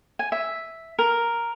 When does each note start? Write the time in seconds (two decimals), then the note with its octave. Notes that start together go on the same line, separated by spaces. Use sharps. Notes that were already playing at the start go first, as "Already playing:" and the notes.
0.19 G#5
0.32 E5
0.99 A#4